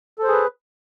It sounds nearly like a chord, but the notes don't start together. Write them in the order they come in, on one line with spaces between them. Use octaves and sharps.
A4 C5 G#4 B4